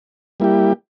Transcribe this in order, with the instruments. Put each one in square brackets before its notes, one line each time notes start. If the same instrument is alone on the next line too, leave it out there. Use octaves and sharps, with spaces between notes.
[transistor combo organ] G3 A#3 E4 G4